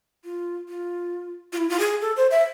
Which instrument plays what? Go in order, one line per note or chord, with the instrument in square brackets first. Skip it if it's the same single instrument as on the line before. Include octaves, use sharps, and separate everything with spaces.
[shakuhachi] F4
F4
F4
E4
F4
G#4
A4
C5
E5